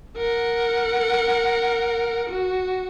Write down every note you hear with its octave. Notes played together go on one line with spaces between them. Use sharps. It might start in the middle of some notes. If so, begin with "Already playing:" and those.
A#4 F#5
F#4